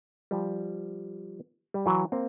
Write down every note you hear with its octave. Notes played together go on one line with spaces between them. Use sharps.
F3 G3
G3
E3 F#3
A#3 C4